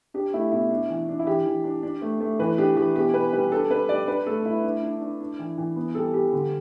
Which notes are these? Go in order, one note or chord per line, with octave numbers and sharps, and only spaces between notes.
D4 G4
A3 E4
B2 E4
D4
E3
D4
E4
E3 G4
E3
D4
D4
A3
A3
E3 B4
D4 G4
E3 G4
B2 G4
B2 B4
G3 B4
D4 A4
D4 B4
G3 D5
D4 B4
A3 A4
A3 E4
D4
D4
D4
D4
E3
E3
B3
G3 A4
G3 G4
D3